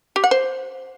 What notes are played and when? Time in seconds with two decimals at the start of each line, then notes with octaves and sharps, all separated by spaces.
0.16 G4
0.24 F#5
0.31 C5